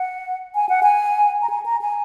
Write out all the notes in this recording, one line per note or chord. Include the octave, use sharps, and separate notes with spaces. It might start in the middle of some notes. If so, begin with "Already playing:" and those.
Already playing: F#5
G#5
F#5
G#5
A#5
G#5
A#5
G#5